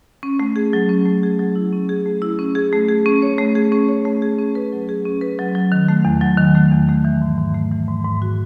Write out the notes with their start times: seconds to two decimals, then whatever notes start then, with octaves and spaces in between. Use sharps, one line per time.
0.23 C#4
0.40 A3
0.56 G#4
0.73 F#3
0.89 C#4
1.06 A3
1.23 G#4
1.39 F#3
1.55 E4
1.73 C#4
1.89 G#4
2.06 A3
2.22 E4
2.39 C#4
2.55 G#4
2.73 A3
2.88 G#4
3.06 C#4
3.22 C#5
3.38 A3
3.55 G#4
3.72 C#4
3.89 C#5
4.05 A3
4.22 G#4
4.38 C#4
4.55 B4
4.72 F#3
4.89 G#4
5.05 C#4
5.21 B4
5.39 F#3
5.55 F#3
5.72 D#3
5.88 A3
6.05 E2
6.21 F#3
6.38 D#3
6.55 A3
6.71 E2
6.89 A3
7.05 E3
7.21 G#2
7.38 G#2
7.55 A3
7.72 E3
7.88 G#2
8.05 G#2
8.22 F#4